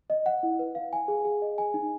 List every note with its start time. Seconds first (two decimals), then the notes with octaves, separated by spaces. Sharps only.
0.10 D#5
0.26 F#5
0.43 E4
0.59 B4
0.75 F5
0.93 G#5
1.08 G#4
1.25 G#4
1.42 D#5
1.58 G#5
1.74 D#4